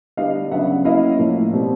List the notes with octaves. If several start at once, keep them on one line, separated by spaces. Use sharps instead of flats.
D3 G3 B3 D4 D#5 F5
C#3 F#3 B3 D4 E5 F#5
F#3 A#3 C#4 E4 D#5 F5
A2 F3 A#3
B2 G3 C4